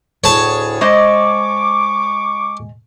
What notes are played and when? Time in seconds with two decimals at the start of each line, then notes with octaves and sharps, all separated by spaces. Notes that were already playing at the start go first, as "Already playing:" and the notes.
0.24 D2 A2 G#4 C#5 A5
0.81 G#3 C5 D#5 C#6 D6